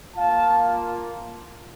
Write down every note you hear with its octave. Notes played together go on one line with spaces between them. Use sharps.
A#3 F4 F5 A5